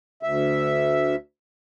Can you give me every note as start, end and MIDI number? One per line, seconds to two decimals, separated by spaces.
0.23 1.15 38
0.23 1.15 76